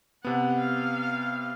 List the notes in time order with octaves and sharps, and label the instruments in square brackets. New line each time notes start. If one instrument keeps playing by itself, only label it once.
[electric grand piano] C3 B3 [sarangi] F#5
[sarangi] F5